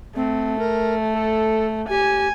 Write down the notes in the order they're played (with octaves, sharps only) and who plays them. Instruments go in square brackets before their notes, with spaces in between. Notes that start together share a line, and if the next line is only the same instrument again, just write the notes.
[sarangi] A3 [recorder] C4
[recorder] A#4
A4
[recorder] G4 [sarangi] G#5